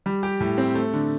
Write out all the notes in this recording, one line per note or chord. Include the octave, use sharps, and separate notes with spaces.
G3
G4
A2
C4
A3
D3